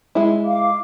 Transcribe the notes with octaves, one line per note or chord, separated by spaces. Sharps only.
G#3 E4
F5 D6